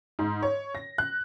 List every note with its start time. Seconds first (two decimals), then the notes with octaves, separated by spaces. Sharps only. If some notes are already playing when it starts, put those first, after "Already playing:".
0.19 G#2
0.42 C#5
0.75 A#6
0.98 F#6